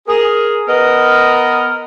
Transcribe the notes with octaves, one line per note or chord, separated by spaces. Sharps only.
G#4 A#4
B3 A#4 B4 D#5